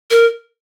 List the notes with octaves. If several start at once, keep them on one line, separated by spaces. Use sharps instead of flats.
A#4